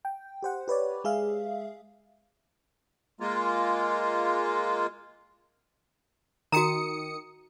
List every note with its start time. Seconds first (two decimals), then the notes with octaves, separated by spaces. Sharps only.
0.05 G5
0.42 G4 C5 F#5
0.68 G4 B4 C#5 D5
1.04 G#3 G#4 E5 F5
3.20 G#3 A#3 F4
6.52 D#3 F#4 A#5 D#6 C#7